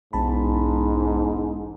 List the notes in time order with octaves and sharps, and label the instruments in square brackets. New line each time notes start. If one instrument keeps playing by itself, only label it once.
[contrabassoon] E1 [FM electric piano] B1 A5 B5 [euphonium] G#2